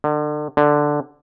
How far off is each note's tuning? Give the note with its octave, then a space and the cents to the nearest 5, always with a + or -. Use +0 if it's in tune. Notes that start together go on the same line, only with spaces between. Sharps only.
D3 +35
D3 +5